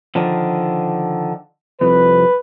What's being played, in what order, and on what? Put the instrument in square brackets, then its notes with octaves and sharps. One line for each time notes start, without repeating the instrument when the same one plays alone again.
[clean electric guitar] D3 D#3 F3
[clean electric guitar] C2 F2 [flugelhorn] B4